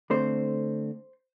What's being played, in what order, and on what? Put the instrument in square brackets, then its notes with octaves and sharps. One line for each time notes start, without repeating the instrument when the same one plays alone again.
[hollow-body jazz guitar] D3 A3 C4 C5